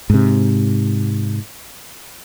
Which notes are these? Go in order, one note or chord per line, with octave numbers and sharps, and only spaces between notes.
G#2 C3